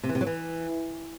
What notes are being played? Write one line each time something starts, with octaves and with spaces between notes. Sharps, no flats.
C3
E3
C3
F#3
E3